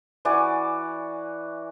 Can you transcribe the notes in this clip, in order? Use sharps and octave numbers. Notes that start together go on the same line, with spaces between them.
E3 F#4 D5 G#5